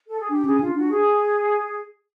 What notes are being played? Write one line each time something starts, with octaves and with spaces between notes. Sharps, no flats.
A4
G#4
D4 G4
C#4 G#4
D4 F4
D4 F#4
G#4